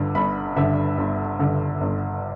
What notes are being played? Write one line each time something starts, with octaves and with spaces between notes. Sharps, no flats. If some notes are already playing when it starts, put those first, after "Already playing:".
Already playing: G1 G2 D3
G1 B5
G2 D3 E5
G1
G2 D3
G1